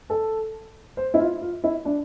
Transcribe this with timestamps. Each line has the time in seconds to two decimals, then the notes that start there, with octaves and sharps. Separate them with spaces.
0.10 A4
0.97 C5
1.14 E4
1.19 F4
1.41 F4
1.64 E4
1.85 D4